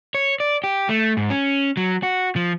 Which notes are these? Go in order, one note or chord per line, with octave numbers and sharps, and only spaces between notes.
C#5
D5
G4
A3
G#2
C#4
F#3
F#4
F3